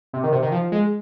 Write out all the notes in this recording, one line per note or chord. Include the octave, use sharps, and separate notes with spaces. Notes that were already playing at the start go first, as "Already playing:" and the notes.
C3
D#3
C3
D#3
F3
G#3